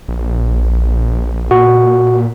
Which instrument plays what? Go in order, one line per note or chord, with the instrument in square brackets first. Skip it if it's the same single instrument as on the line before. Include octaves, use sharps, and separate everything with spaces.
[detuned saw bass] A#1
[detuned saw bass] A#2 [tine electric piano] F#4